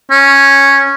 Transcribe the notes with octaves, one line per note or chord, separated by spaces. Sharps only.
C#4